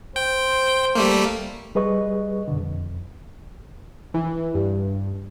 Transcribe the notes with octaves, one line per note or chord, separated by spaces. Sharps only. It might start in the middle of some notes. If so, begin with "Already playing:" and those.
C5 G5
G3 A3 A#3
G3 G#4 B4 D#5 C#6
F#2 B2 D3
F2
E3
G2